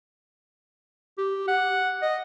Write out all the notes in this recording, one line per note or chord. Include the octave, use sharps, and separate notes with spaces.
G4
F#5
D#5